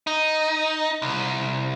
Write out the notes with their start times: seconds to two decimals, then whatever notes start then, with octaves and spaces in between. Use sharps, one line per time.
0.07 D#4
1.02 C2